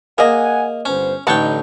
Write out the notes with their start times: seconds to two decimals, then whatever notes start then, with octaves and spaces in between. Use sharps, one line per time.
0.18 A#3 G#4 D#5 F#5 G#5
0.85 G1 B3 C#4 C5
1.27 A1 D3 D#4 C#5 F#5 G5 A5